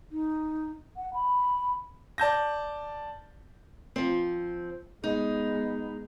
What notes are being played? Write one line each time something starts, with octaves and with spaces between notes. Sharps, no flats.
D#4
F#5
B5
D5 A5 G6 A#6
F3 C4
G#3 B3 D#4